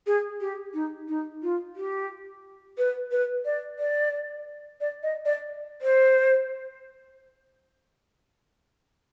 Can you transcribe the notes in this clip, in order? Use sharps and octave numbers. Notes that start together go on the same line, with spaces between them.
G#4
G4
D#4
D#4
F4
G4
B4
B4
D5
D5
D5
D#5
D5
C5